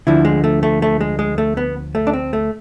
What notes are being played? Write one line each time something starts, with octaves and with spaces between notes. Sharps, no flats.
D2 D3 F3 E4
G#3
A3
A3
A3
G#3
G#3
A3
B3
A3
D4
C4
A3